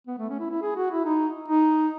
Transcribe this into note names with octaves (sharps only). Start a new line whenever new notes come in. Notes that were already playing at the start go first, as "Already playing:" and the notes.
B3
A3
C#4
E4
E4
G#4
F#4
E4
D#4
D#4